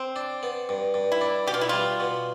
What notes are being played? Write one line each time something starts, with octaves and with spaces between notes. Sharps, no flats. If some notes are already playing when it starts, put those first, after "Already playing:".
Already playing: C4
D4
B3
G2
G2
E4
D4
B2 G4
F4
E4
G3 F4
B2